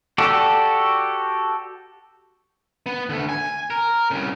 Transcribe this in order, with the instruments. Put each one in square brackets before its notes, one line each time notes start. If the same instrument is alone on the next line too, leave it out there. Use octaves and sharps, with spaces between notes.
[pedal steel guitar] F#4 G4 A4 D5
[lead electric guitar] B3
D3 A3
G#5
A#4
C2 C#3